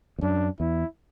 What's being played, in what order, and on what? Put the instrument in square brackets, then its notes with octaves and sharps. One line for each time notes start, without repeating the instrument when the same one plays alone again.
[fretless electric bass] E2
[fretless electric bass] F#2 [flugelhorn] D4
[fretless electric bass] E2 [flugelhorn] E4